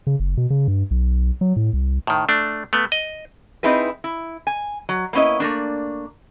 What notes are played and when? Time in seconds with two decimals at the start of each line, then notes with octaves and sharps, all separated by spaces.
0.07 C#3
0.20 F#1
0.37 B2
0.50 C#3
0.68 G2
0.91 B1
1.41 F#3
1.56 A2
1.73 C2
2.07 A2 D#3
2.29 A3 D4
2.73 A3 B3
2.92 D#5
3.63 C4 D#4 E4 G#4 B4
4.04 E4
4.47 G#5
4.89 F#3
5.13 A#3 B3 C#4 E4 D#5
5.40 A3 A#3 D4